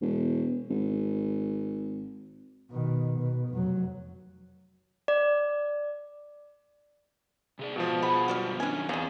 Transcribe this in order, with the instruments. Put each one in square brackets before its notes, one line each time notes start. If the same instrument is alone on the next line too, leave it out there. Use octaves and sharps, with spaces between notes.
[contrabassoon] E1
G#1
[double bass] B2 D#3
B2
F1 F#3
[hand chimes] D5
[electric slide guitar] C3 G#4 D5
[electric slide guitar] G#2 F4 A5 [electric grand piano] B2 F3
[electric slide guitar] G#4 C5 F#5 [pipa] B5
[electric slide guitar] F#2 G3 B3 [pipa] F#4 D5 F5
[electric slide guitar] F#2 D#3 C#4 [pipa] D4 G#5
[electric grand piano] E2 [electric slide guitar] C4 F5 [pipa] C#5 D#5